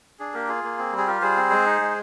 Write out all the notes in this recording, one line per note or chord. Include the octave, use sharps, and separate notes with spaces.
D4 G#4
A#3 G4 A#4
F4 G#4
A#3
C4
G3
G#4
F4 G4 A#4
G3 G#4 C5
C4
G#3
D#4
G#3